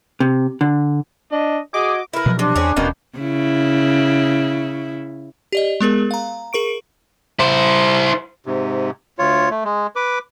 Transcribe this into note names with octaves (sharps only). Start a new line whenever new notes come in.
C3
D3
D4 D#5
F#4 G#4 D#5 D6
E4 A#4 B4
B2 F3 F#3
C3 D4
E2 C4 C#4 G#4
D#1 B2 D#3 A#3 C#4
C#3 E4
G4 D5 D#5
G#3 B3 G#4 A#4
F5 A#5
G#4 A#4 C#6 D7
E4 C5
G#2 C3
D2 F4 C#5
A3
G#3
B4 D6